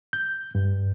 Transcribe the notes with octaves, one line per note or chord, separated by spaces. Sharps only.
G6
G2